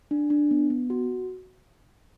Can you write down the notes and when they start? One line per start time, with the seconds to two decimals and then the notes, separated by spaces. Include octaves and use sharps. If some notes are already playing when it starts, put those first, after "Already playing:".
0.11 D4
0.30 D4
0.51 B3
0.70 B3
0.90 F#4